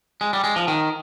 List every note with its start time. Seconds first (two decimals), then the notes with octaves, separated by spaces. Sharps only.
0.21 G#3
0.33 G3
0.44 G#3
0.56 F3
0.68 D#3